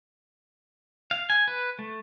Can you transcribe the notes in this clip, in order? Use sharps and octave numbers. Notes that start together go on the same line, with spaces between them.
F5
G#5
B4
A3